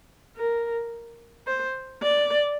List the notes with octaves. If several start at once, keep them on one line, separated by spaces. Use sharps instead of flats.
A#4
C5
D5